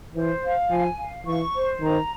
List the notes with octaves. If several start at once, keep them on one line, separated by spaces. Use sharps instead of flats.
E3 C5
F5
F3 G#5
F5
E3 C#6
C5
D#3 A#5